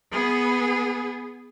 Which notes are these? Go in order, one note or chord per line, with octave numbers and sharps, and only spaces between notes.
B3 G#4